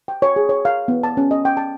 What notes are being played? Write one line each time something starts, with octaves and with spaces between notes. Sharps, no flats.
G5
C#5
G#4
C#5
F5
B3
A5
C#4
D#5
G5
A5